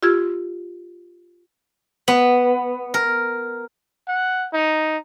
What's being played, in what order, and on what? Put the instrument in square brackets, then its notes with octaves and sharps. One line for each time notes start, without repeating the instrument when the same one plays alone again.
[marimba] F4 G4 E6 G#6
[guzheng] B3
A#4
[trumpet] F#5
D#4